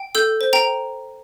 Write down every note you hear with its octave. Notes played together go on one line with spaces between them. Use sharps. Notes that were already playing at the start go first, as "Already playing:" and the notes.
Already playing: G5
A4 E6 G6
C5
G5 A#5